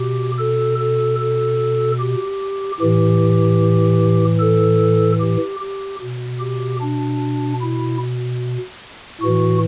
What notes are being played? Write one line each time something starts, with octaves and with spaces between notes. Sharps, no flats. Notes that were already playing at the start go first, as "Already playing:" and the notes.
Already playing: B2 G4
A4
A4
A4
G4
A2 E3 G4
A4
G4
G4
B2
G4
D4
E4
A2 E3 F#4